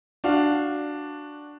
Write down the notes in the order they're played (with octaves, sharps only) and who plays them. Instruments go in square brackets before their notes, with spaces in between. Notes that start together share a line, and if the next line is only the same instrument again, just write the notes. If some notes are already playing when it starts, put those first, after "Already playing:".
[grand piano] D4 F#4 F5